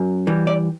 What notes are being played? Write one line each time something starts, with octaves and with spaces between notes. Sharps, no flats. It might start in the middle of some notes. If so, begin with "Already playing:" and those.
Already playing: F#2
E3 G3
D5